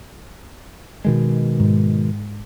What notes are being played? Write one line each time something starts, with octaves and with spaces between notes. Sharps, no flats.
B2 D#3 G#3
G#2